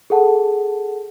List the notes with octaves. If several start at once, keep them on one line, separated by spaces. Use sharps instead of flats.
G#4 A4 F#5 A5